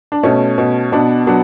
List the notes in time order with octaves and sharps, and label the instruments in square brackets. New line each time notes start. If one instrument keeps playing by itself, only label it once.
[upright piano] D4
B2 A3 C#4
B2
B2 B3 D4
F#3 B3 D4